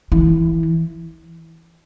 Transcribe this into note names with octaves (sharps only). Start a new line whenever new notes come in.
E3